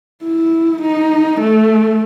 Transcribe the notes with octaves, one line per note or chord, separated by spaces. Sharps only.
E4
D#4
A3